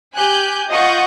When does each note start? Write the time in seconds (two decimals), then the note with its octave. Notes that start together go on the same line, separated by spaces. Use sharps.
0.15 G4 G#5 F#6 G6
0.71 F4 D#5 F#5 C#6 D#6 G6